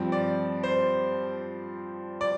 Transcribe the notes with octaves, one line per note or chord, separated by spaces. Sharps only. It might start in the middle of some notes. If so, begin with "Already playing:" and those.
Already playing: G2 F3 C4
D5
C5
D5